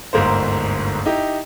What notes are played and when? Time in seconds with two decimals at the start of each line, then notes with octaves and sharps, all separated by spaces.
0.13 G1 D2 G#2 A#3 C5
1.06 D#4 E4 G4